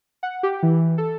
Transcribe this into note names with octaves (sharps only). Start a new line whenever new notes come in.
F#5
G4
E3
A4